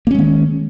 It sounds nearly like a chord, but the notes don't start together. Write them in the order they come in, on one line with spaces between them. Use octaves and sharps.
A#3 C#4 G#3 D#3